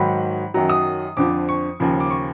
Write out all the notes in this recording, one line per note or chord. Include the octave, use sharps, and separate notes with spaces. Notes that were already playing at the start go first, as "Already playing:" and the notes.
Already playing: G#2 D#3 F#3 B5
F#2 D#3 F#3 A#5
D#6
F2 D3 F3 D6
C#6
D#2 C#3 F3
D6
C#6